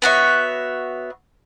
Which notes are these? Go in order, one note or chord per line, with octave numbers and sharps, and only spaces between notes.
B3 F#4 C#5 E5